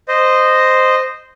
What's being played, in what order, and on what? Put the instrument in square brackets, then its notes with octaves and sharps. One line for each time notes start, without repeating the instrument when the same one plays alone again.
[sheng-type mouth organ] C5 D#5